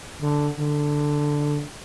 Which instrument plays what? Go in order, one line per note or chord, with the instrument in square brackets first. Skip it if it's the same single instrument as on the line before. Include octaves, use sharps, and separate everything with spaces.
[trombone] D3
D3